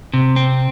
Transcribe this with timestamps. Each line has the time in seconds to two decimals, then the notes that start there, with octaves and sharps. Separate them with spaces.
0.14 C3
0.36 C4